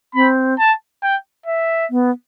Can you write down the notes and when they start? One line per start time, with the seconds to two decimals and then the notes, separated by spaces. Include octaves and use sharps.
0.15 C4 B5
0.59 A5
1.03 G5
1.46 E5
1.90 B3